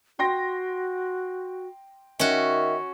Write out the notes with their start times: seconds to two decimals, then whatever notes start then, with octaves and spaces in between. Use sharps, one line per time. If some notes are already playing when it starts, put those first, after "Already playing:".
0.19 F#4 G5 C6 A#6
2.19 D#3 C#4 F#4 E5